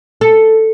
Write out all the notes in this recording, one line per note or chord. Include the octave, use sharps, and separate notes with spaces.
A4